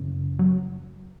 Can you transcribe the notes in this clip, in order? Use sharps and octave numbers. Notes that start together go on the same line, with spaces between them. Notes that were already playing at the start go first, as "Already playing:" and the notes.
Already playing: F#2 C#3
F#3